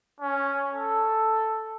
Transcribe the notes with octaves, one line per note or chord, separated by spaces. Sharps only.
C#4
A4